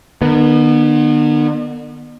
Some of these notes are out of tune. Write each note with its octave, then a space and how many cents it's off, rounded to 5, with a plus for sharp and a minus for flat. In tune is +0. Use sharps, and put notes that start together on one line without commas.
D#3 -45 B3 -20